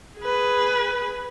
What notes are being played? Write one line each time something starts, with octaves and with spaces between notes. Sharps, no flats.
G#4 B4